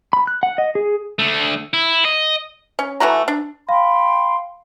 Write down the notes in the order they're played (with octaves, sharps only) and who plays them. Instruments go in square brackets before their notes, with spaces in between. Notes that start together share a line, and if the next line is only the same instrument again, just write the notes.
[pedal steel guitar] B5
F#6
F#5
D#5
G#4
[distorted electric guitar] D3 A3
E4
D#5
[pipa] C#4
E3 A3 F#4 A#5
D4
[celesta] F5 [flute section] G5 B5 C6